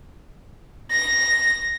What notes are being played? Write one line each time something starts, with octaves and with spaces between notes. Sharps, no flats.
A#6